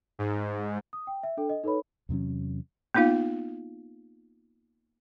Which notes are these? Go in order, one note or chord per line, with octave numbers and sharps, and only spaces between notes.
G#2
D#6
G5
E5
D4 A4 G5
D#5
D#4 A4 B4 C#5 B5
E2 C3 F#3 C#4
A#3 B3 D#4 F4 F5